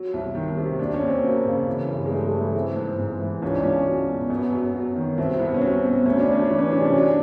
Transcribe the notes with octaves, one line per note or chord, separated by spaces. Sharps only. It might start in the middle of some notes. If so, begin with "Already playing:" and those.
Already playing: F#3
C2
D#3
C3
D#2 D4
C#4
D#2
C4
F#3 A#3
C#3
E3
G2
G#3
G2 A3
G#3
E3
A3
E3 C4
G#2
G#2
E3
C#2 C#4
D4
C#2 C#4
F#3
B2
F#2 B3
F#2
F#3
D#3
C2 C4
C2 B3
C#4
F#3 C4
B2
D2 C#4
D4
D2 C#4
E3 D4
C#4
C3 D4
C#4
F#3 D4